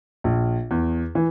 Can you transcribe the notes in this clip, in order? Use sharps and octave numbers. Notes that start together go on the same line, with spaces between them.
A#1
E2
E3